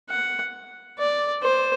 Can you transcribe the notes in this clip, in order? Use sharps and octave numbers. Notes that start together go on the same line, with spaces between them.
F#5
D5
C5